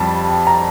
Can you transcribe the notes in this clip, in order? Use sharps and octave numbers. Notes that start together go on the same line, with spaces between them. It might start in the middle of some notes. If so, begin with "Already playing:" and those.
Already playing: F2 G3 A5
A#5